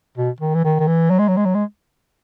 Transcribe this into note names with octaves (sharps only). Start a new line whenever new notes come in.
B2
D#3
E3
D#3
D#3
E3
F#3
G#3
F#3
G#3
F#3
G#3